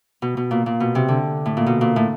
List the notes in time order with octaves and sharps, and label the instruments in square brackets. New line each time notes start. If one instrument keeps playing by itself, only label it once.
[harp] B2
B2
A#2
A#2
B2
C3
D3
A2
A#2
B2
A#2
A2